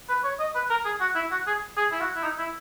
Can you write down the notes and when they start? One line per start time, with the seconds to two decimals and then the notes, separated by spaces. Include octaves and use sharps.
0.09 B4
0.24 C#5
0.40 D#5
0.55 B4
0.70 A#4
0.85 G#4
1.01 F#4
1.15 E4
1.31 F#4
1.47 G#4
1.77 G#4
1.92 E4
2.01 F#4
2.16 E4
2.24 D#4
2.39 E4